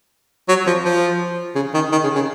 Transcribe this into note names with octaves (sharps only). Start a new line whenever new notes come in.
F#3
F3
F3
C#3
D#3
D#3
C#3
C#3